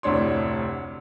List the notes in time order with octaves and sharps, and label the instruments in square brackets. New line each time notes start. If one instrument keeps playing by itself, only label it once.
[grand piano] F1 D2 A2 D4 C#5 C6